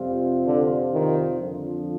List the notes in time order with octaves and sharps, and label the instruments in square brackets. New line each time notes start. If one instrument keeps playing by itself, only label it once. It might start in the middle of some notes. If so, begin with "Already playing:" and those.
Already playing: [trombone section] F2 C3 G3 C4 F4
[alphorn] D3
D#3
[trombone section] F2 D3 F3